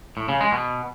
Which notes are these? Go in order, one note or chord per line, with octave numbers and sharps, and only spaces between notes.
A2
C#3
G#3
B2